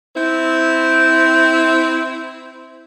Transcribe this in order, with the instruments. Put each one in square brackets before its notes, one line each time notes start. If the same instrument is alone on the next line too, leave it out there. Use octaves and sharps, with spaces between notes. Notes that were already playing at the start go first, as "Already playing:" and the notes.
[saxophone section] C4 E4